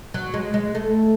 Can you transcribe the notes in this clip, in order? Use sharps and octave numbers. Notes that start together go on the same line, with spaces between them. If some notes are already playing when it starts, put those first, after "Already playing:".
F#3
G#3
G#3
A3